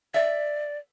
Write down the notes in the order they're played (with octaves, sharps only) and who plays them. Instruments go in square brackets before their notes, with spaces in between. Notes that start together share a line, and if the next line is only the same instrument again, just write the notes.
[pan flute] D5 [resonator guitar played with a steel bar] E5